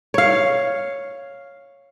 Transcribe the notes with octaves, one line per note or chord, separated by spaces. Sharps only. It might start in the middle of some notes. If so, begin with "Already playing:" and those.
C#5 F5